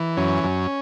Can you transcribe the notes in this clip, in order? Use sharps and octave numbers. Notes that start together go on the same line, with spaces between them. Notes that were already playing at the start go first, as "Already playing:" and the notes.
Already playing: E3
F#2 C#4
F#2